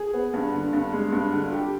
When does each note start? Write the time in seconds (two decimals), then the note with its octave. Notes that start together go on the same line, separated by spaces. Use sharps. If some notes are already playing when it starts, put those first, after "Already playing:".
Already playing: G#4
0.14 B3
0.34 G2
0.53 D3
0.73 G2
0.93 G#3
1.12 G2
1.32 D3
1.52 G4